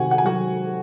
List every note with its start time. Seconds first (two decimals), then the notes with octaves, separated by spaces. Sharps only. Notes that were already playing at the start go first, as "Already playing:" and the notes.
Already playing: C3 D#3 F#4 F#5 G#5
0.11 F#5
0.18 G#5
0.24 F#3 F#4 F#5